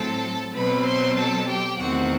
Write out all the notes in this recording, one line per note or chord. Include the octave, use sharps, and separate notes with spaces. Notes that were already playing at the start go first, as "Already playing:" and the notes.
Already playing: A2 F#3 C4 A4 A5
B2 F#3 C4 B4 B5
C5 C6
A4 A5
G4 G5
E2 D#3 A3 C4 F#4 F#5